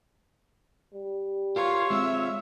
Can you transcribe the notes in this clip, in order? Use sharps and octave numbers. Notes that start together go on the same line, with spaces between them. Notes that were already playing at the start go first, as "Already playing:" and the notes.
G3
F4 G4 A#4 B4 C#5
G#3 C4 F4 E5